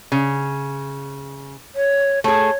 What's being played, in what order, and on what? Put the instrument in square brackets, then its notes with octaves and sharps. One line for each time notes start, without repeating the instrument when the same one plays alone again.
[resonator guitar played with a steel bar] C#3
[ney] C#5
[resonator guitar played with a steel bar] A3 G#4 [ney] C#5